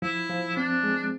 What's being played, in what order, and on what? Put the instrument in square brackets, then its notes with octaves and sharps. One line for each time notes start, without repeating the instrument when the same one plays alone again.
[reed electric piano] F3 [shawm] E4
[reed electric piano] F3
[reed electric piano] C4 [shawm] D4
[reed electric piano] G#3